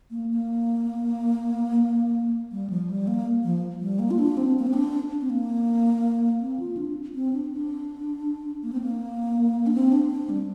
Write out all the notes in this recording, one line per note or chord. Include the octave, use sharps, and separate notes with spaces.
A#3
A#3
G3
F3
G3
A#3
F3
G3
A#3
F4
D4
C4
A#3
C4
D4
C4
A#3
C4
F4
D4
C4
D4
D4
A#3
C4
A#3
D4
C4
D4
D4
G3